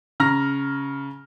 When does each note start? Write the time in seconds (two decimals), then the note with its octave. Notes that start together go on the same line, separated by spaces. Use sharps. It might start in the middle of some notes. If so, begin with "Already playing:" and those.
0.20 C#3 A#5 F6 A#6